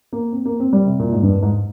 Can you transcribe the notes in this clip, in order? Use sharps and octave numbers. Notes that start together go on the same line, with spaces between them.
A#3
C4
A#3
C4
G3
C3
A#2
G#2
G2
G#2